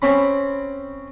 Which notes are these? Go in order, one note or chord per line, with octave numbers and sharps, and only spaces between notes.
C4 C#4 B5